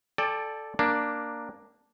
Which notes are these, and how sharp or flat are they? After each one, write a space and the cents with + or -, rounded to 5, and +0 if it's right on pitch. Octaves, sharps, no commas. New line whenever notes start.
A4 -5 D5 +5 G5 +35
A#3 +0 D4 +0